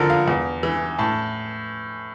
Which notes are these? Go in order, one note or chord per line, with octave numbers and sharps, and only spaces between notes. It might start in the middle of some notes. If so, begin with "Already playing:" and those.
Already playing: F2 D3 F3 A4 A#4
F5
E2
E3
A2 A5